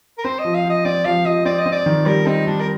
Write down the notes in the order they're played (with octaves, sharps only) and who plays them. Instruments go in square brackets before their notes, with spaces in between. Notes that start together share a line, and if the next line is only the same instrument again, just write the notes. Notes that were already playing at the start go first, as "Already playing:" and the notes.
[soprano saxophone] A#4
[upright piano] C4 [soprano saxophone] C5
[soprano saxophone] D#5
[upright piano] F3
[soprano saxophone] F5
[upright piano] F3
[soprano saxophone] D#5
[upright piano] C4 [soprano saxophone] D5
[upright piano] F3 [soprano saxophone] F5
[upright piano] F3 [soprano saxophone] D#5
[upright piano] C4 [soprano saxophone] D5
[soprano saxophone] D#5
[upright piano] C4
[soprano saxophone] D5
[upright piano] D#3
[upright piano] G3 [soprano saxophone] A#4
[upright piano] C4 [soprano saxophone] D#4
[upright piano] G3 [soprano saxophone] D4
[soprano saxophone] A#4